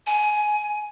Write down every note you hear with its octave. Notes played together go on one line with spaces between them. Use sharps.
G#5